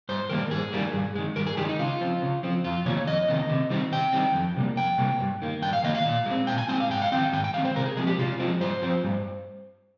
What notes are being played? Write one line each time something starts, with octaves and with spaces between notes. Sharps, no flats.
G2 C5
D#3 G3 A#3 A#4
G2 G#4
D#3 G3 A#3
G2
D#3 G#3
G2 A#4
G#4
D#3 G#3 G4
D#4
C#3 F4
F3 C4
C#3
F3 C4
F2 F4
C3 D#3 A#3 C#5
F2 D#5
C3 D#3 A#3
C3
D#3 G3 C4
C3 G5
D#3 G3 C4
F2
C3 G3 A#3
F2 G5
C3 G3 A#3
G2
D#3 A#3
G2 G5
F5
D#3 A#3 D#5
F5
A#2
G#3 C4
A#2 G5
G#5
G#3 C4 G5
F5
G#2 G5
F5
D#3 G#3 C4 G5
G#2 G5
G5
D#3 G#3 C4 F5
C5
C3 A#4
G#4
F3 G#3 C4 G#4
G4
C3 F4
F3 G#3 C4
G2 C5
F3 C4
G2